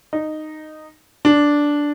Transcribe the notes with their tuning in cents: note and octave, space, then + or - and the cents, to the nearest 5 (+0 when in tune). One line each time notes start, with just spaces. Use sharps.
D#4 -10
D4 -5